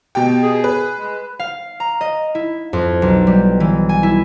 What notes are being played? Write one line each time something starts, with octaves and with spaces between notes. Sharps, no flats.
B2 G4 G5
G#4
B4
G#3
F5
A#5
D#5
E4
F2
B1
G3
E3
G#5
E4